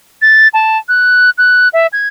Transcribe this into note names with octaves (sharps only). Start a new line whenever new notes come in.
A6
A5
F#6
F#6
E5
G#6